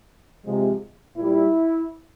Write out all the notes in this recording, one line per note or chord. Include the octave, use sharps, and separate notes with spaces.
C3 F3 G#3
A#2 G3 E4